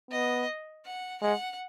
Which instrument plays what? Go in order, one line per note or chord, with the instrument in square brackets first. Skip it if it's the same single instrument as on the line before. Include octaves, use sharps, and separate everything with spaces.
[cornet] B3 [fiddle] D#5
[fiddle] F#5
[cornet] G#3 [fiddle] F#5